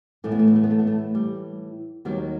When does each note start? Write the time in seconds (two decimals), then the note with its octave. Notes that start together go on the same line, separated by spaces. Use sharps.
0.24 A2 E3 A3
0.32 B3
0.39 A3
0.48 B3
0.55 A3
0.63 B3
0.71 A3
0.79 B3
0.87 A3
1.15 G3
2.05 D#2 D#3 F#3 G3 B3